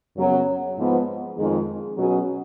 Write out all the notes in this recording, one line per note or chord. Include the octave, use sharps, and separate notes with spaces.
F#2 C#3 F#3 B3
G#2 F3 B3
F2 D#3 G#3 D#4 G#4
B2 F#3 C#4 G#4